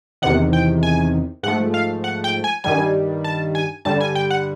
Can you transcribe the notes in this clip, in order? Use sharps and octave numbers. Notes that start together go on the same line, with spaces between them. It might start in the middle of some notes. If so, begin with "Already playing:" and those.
E2 C3 D#3 F#5
G5
G#5
G#2 F3 A3 F#5
F5
F#5
G5
G#5
G2 D#3 G3 G#5
A5
G#5
G2 D3 G3 A5
G#5
G5
F#5